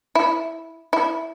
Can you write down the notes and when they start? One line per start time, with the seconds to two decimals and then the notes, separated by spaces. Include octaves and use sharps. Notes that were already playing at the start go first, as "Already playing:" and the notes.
0.15 E4
0.93 E4